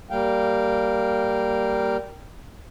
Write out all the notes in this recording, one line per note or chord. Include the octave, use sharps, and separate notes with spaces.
G3 A#3 F5 G5